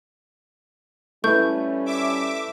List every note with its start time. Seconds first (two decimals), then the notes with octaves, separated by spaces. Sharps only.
1.24 G3 A3 C#4 E4 B4 C#6 G6
1.86 E5 D6